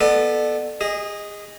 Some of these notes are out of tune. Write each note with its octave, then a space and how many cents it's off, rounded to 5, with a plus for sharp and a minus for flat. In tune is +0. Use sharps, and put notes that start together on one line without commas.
B3 -5 A4 -10 D5 +40
G#4 -30 D#5 +0